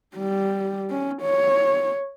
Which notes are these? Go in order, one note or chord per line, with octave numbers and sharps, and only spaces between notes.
G3
C#4
C#5